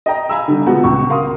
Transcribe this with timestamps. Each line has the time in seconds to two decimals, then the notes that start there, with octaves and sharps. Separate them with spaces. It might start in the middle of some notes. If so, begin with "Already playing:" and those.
0.06 D#5 G5 A#5
0.29 F5 G#5 A#5 B5 E6
0.48 D3 G3
0.66 B2 F3 G#3 B3 F#4
0.83 C#2 C#6
1.09 A#4 F5 C6 D#6